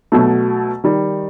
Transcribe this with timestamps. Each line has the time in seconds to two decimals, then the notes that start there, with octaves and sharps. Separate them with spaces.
0.12 B2 F#3 A3
0.84 D#3 G3